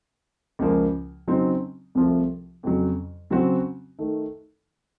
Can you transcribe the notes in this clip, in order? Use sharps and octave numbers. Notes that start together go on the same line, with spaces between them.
C#2 C#3 F3 A#3
C#3 F#3 C4 D#4
C2 C3 F3 A3
F2 C#3 F#3
C#3 F#3 C4 F#4
D#3 A3